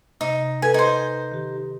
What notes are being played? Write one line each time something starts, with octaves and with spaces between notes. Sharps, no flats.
C3 D#4
A4 B4 G#5 F#6
D#4 C5
D#3 G4